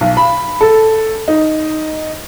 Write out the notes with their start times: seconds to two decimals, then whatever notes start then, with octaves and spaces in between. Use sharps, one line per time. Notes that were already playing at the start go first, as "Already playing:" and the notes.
0.01 B1
0.17 B5
0.61 A4
1.28 D#4